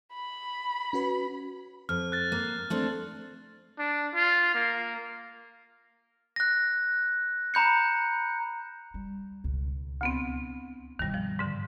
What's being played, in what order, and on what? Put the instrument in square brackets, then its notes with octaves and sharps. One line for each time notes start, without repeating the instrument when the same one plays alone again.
[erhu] B5
[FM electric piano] C#4 F#4 B4
[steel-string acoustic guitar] F2 [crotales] F6
[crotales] F#6 A6
[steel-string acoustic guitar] A#3
A3 C4 D4
[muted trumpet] D4
F4
A#3
[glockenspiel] F#6 A#6
A#5 B5 G6 C#7
[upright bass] G3
C#2 B2
[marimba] D2 B3 C4
[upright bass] G2 B2 [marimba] D#3 G3
[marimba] F3
G#2 D3